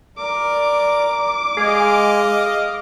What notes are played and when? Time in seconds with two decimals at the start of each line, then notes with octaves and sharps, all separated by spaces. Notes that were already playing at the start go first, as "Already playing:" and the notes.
0.18 A#4 D5 D6
1.57 G#3 G#4 D#5 F5